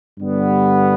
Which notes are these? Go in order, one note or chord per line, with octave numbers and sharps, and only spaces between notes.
G2 D3 G3 B3